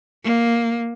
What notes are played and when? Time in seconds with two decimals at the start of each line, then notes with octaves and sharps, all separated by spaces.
0.24 A#3